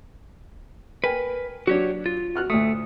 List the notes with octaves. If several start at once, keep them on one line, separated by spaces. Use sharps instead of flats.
A#4 B4 G5 G#5
F#3 D4 F#4 G4 C#5
F4
F#4 F6 F#6
D2 A2 A3 D#6